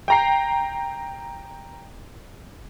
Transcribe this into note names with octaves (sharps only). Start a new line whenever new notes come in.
G5 A#5 C7